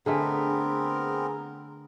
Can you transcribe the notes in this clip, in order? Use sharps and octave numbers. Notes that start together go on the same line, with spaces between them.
D3 A3 B3 C4 G#4 A#4